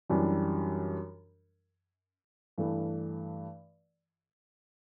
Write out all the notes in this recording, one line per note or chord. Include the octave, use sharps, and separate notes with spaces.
F#2 E3 G3 D4
G2 E3 A3